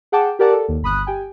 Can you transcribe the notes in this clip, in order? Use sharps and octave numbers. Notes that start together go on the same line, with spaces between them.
G#4 F#5 G5 A5 D6
G4 A#4 D5 F#5 A5 D6
A4
D#2
G1 B5 D#6 F#6
G4 G5 G#5